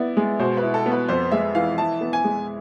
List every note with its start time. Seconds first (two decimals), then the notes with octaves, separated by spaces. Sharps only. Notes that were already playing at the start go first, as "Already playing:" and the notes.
Already playing: B3 E4 D5
0.17 G#3
0.39 B2 C5
0.57 B4
0.63 E4
0.74 A4
0.86 B3
0.92 B4
1.09 F2 C5
1.32 G#3 E5
1.55 E3 F5
1.78 E4 A5
2.01 B3
2.13 G#5
2.24 G#3